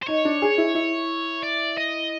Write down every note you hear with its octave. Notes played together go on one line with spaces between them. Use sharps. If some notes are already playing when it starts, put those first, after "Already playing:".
C5
D#4 C#5
D4
G#4
E4
E4
D5
D#5